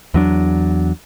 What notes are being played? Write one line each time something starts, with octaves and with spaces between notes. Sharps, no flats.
E2 F#3 D4